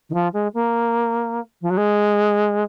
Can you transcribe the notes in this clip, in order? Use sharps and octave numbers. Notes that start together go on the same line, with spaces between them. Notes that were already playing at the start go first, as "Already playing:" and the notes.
D#3
F3
G#3
A#3
F3
F#3
G#3